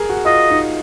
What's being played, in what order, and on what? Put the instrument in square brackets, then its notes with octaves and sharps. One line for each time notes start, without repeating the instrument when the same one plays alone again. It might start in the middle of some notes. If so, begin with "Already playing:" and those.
Already playing: [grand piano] G#4 A#4
F#4
[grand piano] F4 [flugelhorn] D#5
[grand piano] D#4